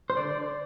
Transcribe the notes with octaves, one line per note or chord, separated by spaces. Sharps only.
C5
D3 D5